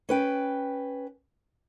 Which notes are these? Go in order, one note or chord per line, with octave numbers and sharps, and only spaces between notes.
C#4 B4 G5